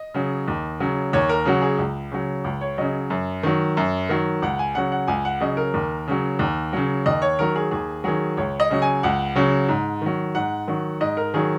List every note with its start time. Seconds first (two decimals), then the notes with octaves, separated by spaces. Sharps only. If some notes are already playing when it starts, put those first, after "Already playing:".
Already playing: D#5
0.14 C#3 F#3
0.48 D#2
0.80 C#3 F#3
1.13 D#2 C#5
1.29 A#4
1.45 C#3 F#3 F#4
1.62 G#4
1.78 C#2
2.12 C#3 F#3
2.44 C#2
2.61 C#5
2.78 C#3 F#3 D#5
3.10 F#2
3.43 D#3 F#3
3.77 F#2
4.09 D#3 F#3
4.42 C#2 F#5
4.59 G#5
4.75 C#3 F#3 F#5
4.92 F#5
5.08 C#2 G#5
5.25 F#5
5.41 C#3 F#3 D#5
5.57 A#4
5.74 D#2
6.08 C#3 F#3
6.39 D#2
6.73 C#3 F#3
7.06 D#2 D#5
7.22 C#5
7.39 D#3 F#3 A#4
7.56 G#4
7.71 D#2 G#4
8.04 D#3 F#3 G#4
8.37 C#2 C#5
8.60 D#5
8.70 C#3 F#3
8.82 G#5
9.03 C#2 F#5
9.36 C#3 F#3
9.69 G#2
10.01 D#3 F#3
10.35 G#2 F#5
10.68 D#3 F#3
11.00 G#2 D#5
11.17 A#4
11.34 D#3 F#3 G#4